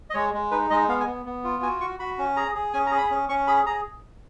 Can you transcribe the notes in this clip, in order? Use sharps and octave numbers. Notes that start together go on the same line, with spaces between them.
D#5
G#3 C#5
G#3
D#4 B4
G#3 D#5
B3 F5
G#5
B3
B3
F4
F#4 G#5
F#4 C#6
F#4 B5
C#4
G#4 A#5
G#4
C#4 G#5
A#5
G#4
B5
C#4
C#4 C#6
G#4 B5
G#4 A#5